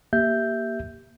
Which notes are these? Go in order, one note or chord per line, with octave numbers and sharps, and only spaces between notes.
A#3 G4 E5 G6